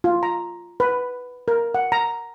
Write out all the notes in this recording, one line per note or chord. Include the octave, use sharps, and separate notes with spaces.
F4
A#5
B4
A#4
F#5
A#5